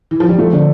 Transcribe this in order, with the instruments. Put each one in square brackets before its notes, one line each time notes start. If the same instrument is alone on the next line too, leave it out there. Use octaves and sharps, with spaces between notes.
[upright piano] E3
F3
G3
[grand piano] F3 [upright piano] A3
[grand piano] D3